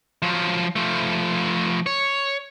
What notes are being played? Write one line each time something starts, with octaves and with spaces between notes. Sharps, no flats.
F3 F#3
F3 A3
C#5